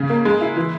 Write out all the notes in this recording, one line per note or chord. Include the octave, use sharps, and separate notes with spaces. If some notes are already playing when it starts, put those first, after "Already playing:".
Already playing: C#3
A#3
G#3
E4
E3